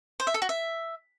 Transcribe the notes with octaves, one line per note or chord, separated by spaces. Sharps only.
C5
E5
A4
F#4
E5